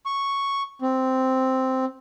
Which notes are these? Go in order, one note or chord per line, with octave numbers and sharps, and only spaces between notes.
C#6
C4